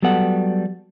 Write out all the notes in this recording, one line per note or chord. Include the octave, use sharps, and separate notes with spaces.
F#3 G3 B3 A4 F#5